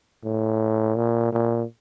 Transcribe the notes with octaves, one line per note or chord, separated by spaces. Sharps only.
A2
A#2
A#2